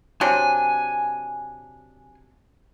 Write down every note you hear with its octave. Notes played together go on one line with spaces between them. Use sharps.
C3 F#3 D4 G#5